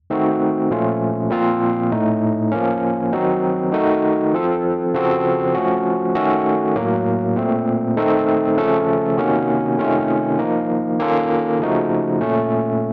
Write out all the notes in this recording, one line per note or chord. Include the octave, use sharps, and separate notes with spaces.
D#3 A3 C4 D#4 F#4
A#2 F3 A3 C#4 F4
A#2 F3 C4 F4
A2 A3 D#4
F3 A#3 C#4
D#3 F#3 C4 D#4 F#4
D#3 A3 D#4 F#4 A4
F3 C4 F4 A4
C#3 F3 C4 F#4 A4
F3 A3 C#4 F#4
D#3 A3 C#4 F#4 A4
A2 F#3 A#3
A#2 A3 C4
D#3 A3 C4 D#4 A4
C#3 F3 A3 C#4 A4
C3 D#3 A#3 C#4 F#4
C3 D#3 A3 C#4 F4
F3 A#3 D#4
D#3 A#3 C#4 F4 A4
C#3 F3 A3 D#4 F#4
A#2 A3 C#4